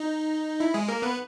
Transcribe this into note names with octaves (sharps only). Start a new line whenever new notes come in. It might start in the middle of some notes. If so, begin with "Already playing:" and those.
Already playing: D#4
E4
G#3 G#4
A#3 A#4
B3 B4